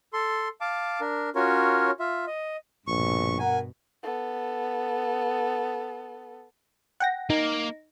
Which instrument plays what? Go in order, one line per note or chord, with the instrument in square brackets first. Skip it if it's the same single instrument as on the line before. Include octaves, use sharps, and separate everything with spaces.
[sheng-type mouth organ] A4 C6
F5 A5 D6
D4 A#4
C#4 F4 F#4 A#4 C#5
F4 E5
D#5
[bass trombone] A#1 [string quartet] G2 B2 [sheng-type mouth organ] C#6
[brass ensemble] A#4 F#5 [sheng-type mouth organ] G#5
[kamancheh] B3 A4
[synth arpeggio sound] F#5 G5 A#6
[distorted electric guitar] A#3 [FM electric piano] D#4